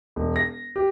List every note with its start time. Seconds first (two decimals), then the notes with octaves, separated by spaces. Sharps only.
0.16 E1
0.36 A#6
0.76 G4